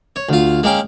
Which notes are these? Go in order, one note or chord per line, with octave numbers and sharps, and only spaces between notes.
C#5
D2 F4
G#3 A#3 C#4 G5